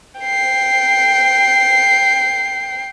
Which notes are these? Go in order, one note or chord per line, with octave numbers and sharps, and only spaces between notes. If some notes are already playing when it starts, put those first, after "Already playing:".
G5 C7